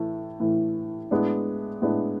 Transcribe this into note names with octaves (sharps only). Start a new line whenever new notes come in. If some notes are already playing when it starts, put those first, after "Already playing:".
Already playing: A2 E3 A3
A2 E3 A3
A2 G#3 B3 D4
A2 G#3 B3 D4